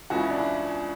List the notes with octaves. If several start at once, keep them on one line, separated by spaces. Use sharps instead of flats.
C#2 C#3 E3 F#4
E4
D4
E4